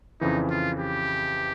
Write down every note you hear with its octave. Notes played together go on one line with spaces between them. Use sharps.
F2 C#3 E3 D#4
F4
G4